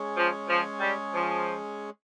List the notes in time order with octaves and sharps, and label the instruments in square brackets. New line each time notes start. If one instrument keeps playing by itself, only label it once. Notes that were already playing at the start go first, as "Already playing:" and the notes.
Already playing: [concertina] G#3 C#4 G#4 C#5
[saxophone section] F3
F3
G3
F3